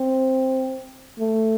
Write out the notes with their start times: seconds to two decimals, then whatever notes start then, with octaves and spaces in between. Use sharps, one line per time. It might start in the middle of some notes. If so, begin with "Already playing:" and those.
Already playing: C4
1.20 A3